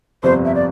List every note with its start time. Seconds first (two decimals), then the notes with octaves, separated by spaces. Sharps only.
0.23 G1 F2 C3 F3 C5
0.45 E5
0.55 D5